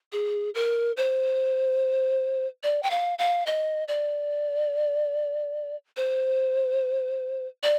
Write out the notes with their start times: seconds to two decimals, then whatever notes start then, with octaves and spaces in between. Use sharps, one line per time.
0.12 G#4
0.55 A#4
0.97 C5
2.63 D5
2.83 G5
2.90 F5
3.19 F5
3.46 D#5
3.88 D5
5.97 C5
7.63 D5